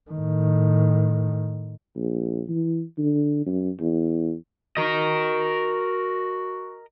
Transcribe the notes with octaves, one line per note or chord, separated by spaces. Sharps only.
A2 D#3
A#1
E3
D3
F#2
E2
F#4 A#4 D#5